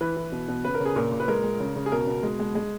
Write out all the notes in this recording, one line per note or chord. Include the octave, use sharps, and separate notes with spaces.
E3 B4
E3
B2
B2
C#3 B4
A#4
C#3
G#4
A#2 A#4
A#2
B4
G#3 A#4
G#3
C#3
C#3
G#4
B2 A#4
B2
G#3
G#3
G#3